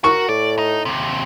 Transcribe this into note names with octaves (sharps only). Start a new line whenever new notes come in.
F#4 A#4 C#6
A2 D5
D#4
D#2 C3